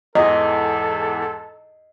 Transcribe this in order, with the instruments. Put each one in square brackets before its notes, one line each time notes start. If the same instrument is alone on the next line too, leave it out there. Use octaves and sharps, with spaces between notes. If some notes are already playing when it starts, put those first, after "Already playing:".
[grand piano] E2 G#2 E3 [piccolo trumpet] A4 [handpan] D#5